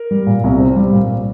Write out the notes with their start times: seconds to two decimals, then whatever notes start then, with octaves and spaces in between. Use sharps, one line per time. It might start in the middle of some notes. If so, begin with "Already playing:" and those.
Already playing: A#4
0.11 G3
0.27 A#2
0.44 C2
0.59 C4
0.76 G3
0.93 A#2